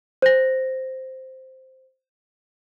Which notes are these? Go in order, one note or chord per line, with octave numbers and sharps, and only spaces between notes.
C5 A#6